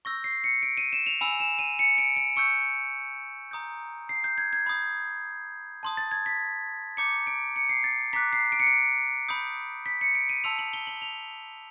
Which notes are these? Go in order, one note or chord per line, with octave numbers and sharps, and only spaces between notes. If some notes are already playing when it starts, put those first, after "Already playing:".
C#6 E6 G6 A#6
C7
C#7
D7
D#7
E7
F7
G#5 B5 E6 F7
E7
D#7
C#7
D7
D7
C#6 E6 G6 C#7
A#5 D#6 G6
C7
G6
G#6
G#6
B5 D#6 G6
A5 C6 D#6
A6
G#6
B6
A#5 D6 G6 C#7
D7
C#7
C7
A6
A#5 D6 F#6 B6
C7
D7
C#7
D7
B5 D#6 G6
B6
C#7
D7
D#7
A5 C6 E6 F7
F#7
G7
F#7
F7